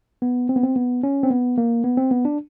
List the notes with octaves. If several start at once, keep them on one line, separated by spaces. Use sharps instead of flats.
B3
C4
B3
C4
B3
C#4
C4
B3
A#3
B3
C4
B3
D4